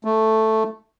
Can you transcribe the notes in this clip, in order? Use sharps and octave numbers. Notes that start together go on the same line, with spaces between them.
A3